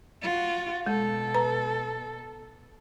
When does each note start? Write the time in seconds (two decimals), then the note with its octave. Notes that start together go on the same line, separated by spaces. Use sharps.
0.23 F4 F#4
0.86 B2 G#3 A4
1.34 B4 A#5